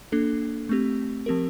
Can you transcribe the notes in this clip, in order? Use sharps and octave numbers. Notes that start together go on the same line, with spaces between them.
A#3 D4 A4
A3 C4 G4
F3 C4 G4 A#4